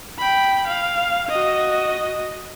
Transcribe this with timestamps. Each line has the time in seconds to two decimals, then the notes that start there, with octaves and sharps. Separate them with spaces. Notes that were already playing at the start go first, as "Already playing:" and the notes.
0.19 G5 B5
0.68 F5
1.29 F#4 D#5